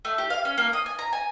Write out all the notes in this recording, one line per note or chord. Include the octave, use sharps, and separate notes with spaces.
A3
G4
F5
C#4
A#3
D#6
G#5
A#5
G#5